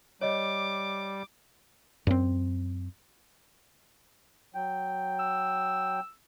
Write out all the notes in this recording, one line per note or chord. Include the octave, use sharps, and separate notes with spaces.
G3 C#5 D#5 D6
F#2 C4
F#3 G5
E6